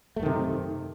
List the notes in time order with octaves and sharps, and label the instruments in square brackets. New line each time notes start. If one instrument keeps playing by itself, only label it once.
[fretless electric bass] A3
F#2
D#3
C3